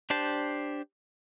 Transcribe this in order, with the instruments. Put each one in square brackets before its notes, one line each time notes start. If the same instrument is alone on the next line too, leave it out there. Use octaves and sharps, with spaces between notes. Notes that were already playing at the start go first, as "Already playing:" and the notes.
[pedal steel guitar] D4 G4 C5 A5